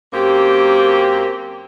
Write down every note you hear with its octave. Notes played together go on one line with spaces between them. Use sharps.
F#2 A#3 C4 G4